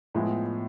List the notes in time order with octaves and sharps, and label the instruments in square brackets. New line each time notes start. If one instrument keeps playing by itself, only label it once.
[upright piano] A2 F3 G#3 B3